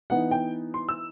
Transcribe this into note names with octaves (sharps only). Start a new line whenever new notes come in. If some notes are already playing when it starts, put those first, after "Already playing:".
E3 B3 D#4 F#5
G5
C6
E6